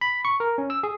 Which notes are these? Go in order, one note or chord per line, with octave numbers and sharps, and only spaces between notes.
B5
C#6
A#4
C#4
E6
G#4